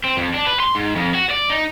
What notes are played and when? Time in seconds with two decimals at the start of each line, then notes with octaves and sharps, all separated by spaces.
0.05 C4
0.18 F2
0.34 D4
0.47 B4
0.60 C6
0.75 G#2
0.96 F2
1.15 F#4
1.31 D5
1.51 D#4